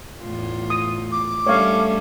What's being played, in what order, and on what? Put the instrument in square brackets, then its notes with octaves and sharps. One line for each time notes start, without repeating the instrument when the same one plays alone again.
[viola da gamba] E2 A2 F4
[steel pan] D#6
[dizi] D6
[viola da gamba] G3 C#4 D4 [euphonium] A3 [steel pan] C#5 F5